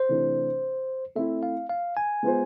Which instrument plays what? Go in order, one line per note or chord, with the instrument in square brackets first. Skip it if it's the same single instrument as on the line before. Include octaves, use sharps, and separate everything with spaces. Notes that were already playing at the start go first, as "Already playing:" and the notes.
Already playing: [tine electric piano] C5
[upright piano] C3 E3 A3 D4
[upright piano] A3 C4 E4 [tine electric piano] E5
[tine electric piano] F5
F5
G#5
[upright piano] G#3 B3 F4 G#4 C5